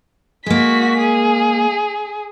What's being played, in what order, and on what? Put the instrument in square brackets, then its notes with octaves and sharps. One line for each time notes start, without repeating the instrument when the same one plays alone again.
[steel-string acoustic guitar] G#3 A#3 [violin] F#4 B6
[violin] G#4